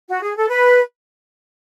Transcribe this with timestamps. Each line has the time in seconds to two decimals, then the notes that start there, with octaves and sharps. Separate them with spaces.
0.09 F#4
0.22 G#4
0.36 A4
0.50 B4